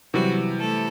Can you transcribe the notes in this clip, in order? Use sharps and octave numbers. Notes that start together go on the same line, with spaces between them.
C3 E3 F#3 G3 F#4
A3 A4